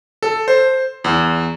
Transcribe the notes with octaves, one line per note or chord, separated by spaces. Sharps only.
A4
C5
E2